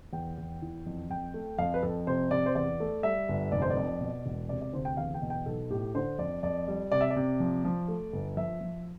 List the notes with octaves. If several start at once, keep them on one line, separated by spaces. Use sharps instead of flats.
E2 G5
E2
E3
F2
F2 G5
A3
F2 F5
B4
F2 A4
C3 C5
C3 D5
C5
E2 D5
A3
G3 E5
G1
F1 D5
C5
D5
F2
B2
E1
C3 D5
D5
D2 C5
G5
E2 F5
G5
B2
G5
B1 A4
A2 G4
D3 C5
F2 D5
F2 D5
G3
C3 D5
E5
D5
C3
F3
F3
A3
G1
F3 E5
F3